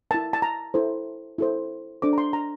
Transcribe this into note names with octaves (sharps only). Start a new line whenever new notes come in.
E4 A#4 A5
A5
A#5
E4 A4 C5
E4 A4 C5
D4 A4 C5 D6
A#5
C6
A#5